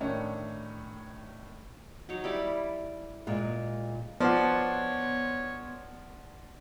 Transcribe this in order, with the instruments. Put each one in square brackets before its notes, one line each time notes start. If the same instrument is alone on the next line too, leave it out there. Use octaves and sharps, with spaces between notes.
[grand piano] A2 D#3 C#4 D4 C#5
[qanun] F#3 D#4 C#5
G3 E4 D5
[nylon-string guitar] A#2 G#3
[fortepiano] F3 [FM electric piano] B3 C6 [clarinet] C#5 [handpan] D5 F#5